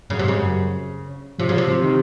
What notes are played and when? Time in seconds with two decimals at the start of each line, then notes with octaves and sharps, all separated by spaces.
0.10 F#2 C#3
0.19 C3
0.24 G#2 C#3
0.38 F#2
1.39 C3 F3
1.49 C#3 F#3
1.53 F3
1.58 C3
1.68 F3
1.83 D#3